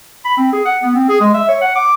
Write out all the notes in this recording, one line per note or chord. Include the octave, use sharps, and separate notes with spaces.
B5
C4
G#4
F#5
B3
C4
G#4
G#3
E5
C#5
F#5
D6